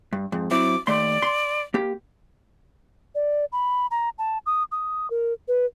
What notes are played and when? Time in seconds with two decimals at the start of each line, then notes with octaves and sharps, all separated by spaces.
0.13 G2
0.32 F2 G#2
0.51 F#3 C4 E4 D6
0.87 D#2 A3 D5 C6
1.22 C6
1.74 A#3 G4
3.15 D5
3.52 B5
3.91 A#5
4.18 A5
4.46 D#6
4.72 D#6
5.10 A#4
5.48 B4